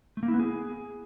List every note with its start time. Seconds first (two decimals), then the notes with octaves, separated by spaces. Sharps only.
0.17 A3
0.23 A#3
0.28 E4
0.34 B3
0.40 G#4